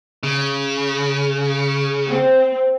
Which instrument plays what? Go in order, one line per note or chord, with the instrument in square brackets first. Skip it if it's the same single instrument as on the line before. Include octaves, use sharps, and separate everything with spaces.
[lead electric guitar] C#3
[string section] C4